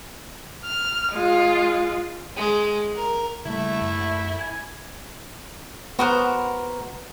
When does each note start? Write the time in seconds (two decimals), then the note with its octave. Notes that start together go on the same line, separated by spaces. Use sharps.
0.65 F6
1.13 G#3 F4
2.37 G#3
2.96 A#4
3.45 C#3 G3 A3 A#3 E4
3.81 F#2
4.39 G#5
5.99 B3 F#4 A#4 C5 F#5